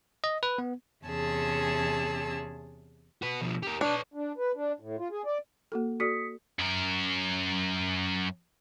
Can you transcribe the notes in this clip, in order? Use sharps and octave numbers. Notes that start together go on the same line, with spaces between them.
D#5
B4
B3
E2 C3 C#4 G#4 A5 E6
F#4 B4
B2 F3
G4 A#4
D4 B4 C#5
D4
B4
D4
A2
F4
G#4
D5
A#3 F#4 A4
F#4 A4 D5 D#6 B6 C#7
F#2 A#4